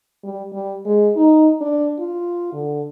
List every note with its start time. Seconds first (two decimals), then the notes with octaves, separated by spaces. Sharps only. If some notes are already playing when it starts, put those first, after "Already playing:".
0.24 G3
0.53 G3
0.86 G#3
1.16 D#4
1.61 D4
1.99 F4
2.53 D3